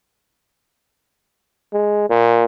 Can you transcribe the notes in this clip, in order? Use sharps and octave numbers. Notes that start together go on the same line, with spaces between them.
G#3
A#2